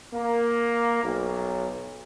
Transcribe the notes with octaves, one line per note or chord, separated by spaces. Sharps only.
A#3
B1